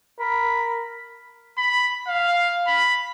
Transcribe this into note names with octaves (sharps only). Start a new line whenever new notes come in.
A#4 B5
B5
F5
B5